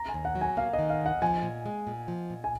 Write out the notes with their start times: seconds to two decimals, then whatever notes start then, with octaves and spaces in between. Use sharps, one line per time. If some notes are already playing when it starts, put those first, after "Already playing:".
Already playing: A#5
0.09 G#5
0.14 D#2
0.25 F#5
0.35 F#3
0.41 G#5
0.57 A#3 F5
0.73 D#5
0.79 D#3
0.90 F5
1.01 D#2 F#5
1.22 F3 G#5
1.43 A#2
1.66 G#3
1.87 A#2
2.08 F3
2.30 A#2
2.44 G#5